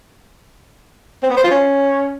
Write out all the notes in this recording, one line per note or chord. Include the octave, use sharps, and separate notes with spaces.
C4
B3
C5
F4
C#4